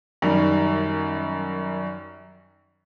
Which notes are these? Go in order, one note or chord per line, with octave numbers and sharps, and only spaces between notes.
F#2 D#3 G3